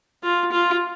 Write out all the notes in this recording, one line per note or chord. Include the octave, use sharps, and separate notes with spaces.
F4
F4